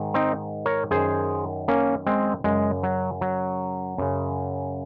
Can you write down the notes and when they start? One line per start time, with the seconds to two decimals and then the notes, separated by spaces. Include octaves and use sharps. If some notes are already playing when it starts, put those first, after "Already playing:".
Already playing: G#2 D#3
0.14 C4 D#4
0.66 A#4 C#5
0.91 F#2 D#3 G#4 C5
1.68 A#3 C#4
2.07 G#3 C4
2.44 F#2 G#3
2.49 C#3
2.83 F#3
3.21 F#3
3.98 F#2 C#3